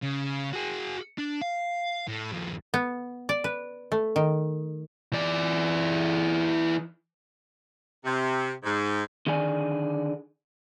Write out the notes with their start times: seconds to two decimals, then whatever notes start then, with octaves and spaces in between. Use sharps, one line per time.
0.03 C#3
0.53 F#4 G#4
1.18 D4
1.41 F5
2.08 A2
2.33 D#2 F3
2.74 B3
3.29 D5
3.44 B4
3.92 A3
4.16 D#3
5.13 E3 D5
8.04 C3
8.63 G#2
9.27 D3 D#3 G#4 D5 G#5